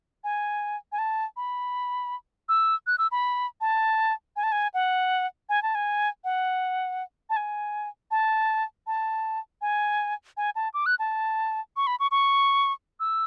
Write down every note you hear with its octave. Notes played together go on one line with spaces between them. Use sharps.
G#5
G#5
A5
B5
E6
F#6
E6
B5
A5
G#5
A5
G#5
F#5
G#5
A5
G#5
F#5
A5
G#5
A5
A5
G#5
G#5
A5
D6
F#6
A5
C#6
B5
C#6
C#6
E6